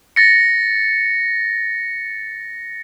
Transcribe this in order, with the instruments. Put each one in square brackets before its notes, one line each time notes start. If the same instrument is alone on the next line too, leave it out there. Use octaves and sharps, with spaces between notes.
[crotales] A6 A#6 C#7